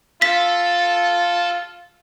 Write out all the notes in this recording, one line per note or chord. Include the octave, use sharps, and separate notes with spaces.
F4 A4 B6